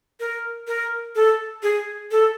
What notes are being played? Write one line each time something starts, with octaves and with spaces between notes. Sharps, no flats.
A#4
A#4
A4
G#4
A4